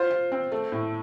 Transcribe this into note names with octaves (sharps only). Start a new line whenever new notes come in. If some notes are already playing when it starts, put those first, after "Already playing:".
Already playing: F4 C5
F4
C4
A3
A2